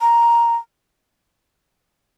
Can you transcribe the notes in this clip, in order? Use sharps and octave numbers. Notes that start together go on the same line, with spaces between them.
A#5